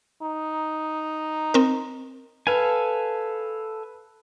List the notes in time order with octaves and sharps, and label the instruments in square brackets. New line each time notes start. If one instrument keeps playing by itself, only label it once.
[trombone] D#4
[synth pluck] C4 A#4
[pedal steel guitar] A4 F5 G#5 [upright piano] B4